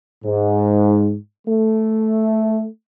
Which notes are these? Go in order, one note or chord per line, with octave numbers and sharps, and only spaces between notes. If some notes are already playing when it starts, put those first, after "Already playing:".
G#2
A3